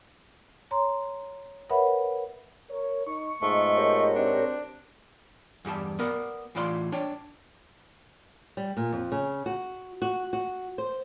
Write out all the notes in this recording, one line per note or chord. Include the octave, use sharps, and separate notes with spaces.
C#5 A#5 C6
A#4 B4 C#5 E5 F#5 B5
A#4 C#5
D#4 C#6
G#2 B2 A3 F4 D#5
G4 A#4 C#5
C4 D4
E2 G2 G4 A5
B3 A#4 D5
A2 E3 F4 D5 F5 C6
D4 C#5 G5
G3
A#2
F2
C#3
F#4
F#4
F#4
C5